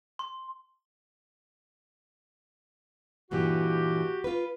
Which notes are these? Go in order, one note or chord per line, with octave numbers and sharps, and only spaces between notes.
C6
G2 A#2 E3 F#4 G4
F4 B4